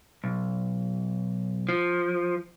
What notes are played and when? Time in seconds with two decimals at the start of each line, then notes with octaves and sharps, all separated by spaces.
0.24 B1
1.69 F3